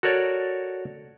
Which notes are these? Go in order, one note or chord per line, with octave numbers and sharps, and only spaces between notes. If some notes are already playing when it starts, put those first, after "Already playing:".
F#4 A4 A#4 C#5 D5